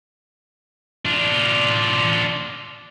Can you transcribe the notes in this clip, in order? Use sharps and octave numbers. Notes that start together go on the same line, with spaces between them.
D4 F4